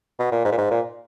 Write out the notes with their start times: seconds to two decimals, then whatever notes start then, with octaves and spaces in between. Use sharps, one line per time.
0.19 B2
0.32 A#2
0.45 G#2
0.52 A#2
0.58 G#2
0.71 A#2